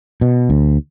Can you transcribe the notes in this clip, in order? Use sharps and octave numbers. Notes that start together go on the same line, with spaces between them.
B2
D2